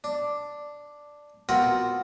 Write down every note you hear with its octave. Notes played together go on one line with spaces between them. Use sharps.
D4
B3 C4 F4 F#4 A#4 F#5